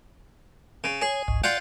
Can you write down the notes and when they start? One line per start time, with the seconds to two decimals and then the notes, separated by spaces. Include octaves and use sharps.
0.84 C#3
1.02 G#4 C#5
1.28 G#1 C#2 G#2
1.44 F4 D5 F#5 G5